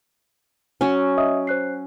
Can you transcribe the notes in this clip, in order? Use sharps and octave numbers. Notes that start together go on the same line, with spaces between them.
F#3 C#4
D#5 E5 D#6
C5 F#6 C7